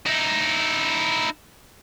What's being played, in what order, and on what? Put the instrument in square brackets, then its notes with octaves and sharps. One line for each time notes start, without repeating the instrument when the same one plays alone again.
[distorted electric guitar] D#4 E4